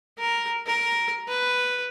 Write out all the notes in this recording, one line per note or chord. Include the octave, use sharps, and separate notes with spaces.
A#4
A#4
B4